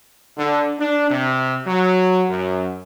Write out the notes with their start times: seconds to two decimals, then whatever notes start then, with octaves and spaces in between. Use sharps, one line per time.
0.38 D3
0.80 D4
1.10 C3
1.66 F#3
2.29 F#2